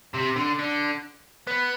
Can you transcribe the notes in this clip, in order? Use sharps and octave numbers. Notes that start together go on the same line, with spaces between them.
C3
D3
D3
B3